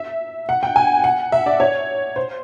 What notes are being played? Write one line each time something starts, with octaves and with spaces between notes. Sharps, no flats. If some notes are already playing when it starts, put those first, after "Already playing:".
Already playing: E5
F#5
G5
G#5
F#5
E5
D5
C#5
C5